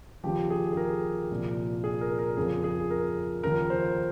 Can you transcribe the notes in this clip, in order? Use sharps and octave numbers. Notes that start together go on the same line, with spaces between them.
D#2 C#3 F3 G4
G#4
G#4
A#4
C2 A#2 F3
G#4
A#4
A#4
F2 C#3 F3 G#4
G#4
A#4
D#2 C#3 F3 A#4
C5